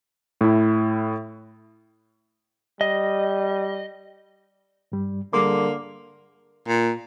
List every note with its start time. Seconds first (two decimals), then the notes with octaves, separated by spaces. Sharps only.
0.41 A2 E4
2.81 G3 D#5
4.92 G2 G3
5.33 D3 G3 A#3 G#4 C6 D6
6.68 A#2